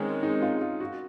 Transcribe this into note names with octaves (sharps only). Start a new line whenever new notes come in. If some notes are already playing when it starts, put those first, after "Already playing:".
Already playing: D#3 G#3 C4 C#4
D#4
F4
F4
F#4